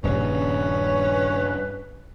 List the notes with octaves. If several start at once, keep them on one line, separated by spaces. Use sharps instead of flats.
D#1 G2 C#3 C#4 B4